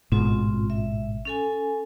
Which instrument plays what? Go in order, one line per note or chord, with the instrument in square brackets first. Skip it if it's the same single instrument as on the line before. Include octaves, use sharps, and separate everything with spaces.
[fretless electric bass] A1 G#2 B2 [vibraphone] C4 F4
[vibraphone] E5
C#4 A4 G#5